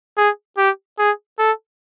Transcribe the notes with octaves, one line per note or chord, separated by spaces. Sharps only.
G#4
G4
G#4
A4